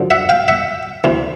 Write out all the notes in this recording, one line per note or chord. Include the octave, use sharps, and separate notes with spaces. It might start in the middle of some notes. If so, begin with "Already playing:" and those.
Already playing: F#2 D3 F3
E5 F#5
F5 G5
E5 F#5
D2 C3 E3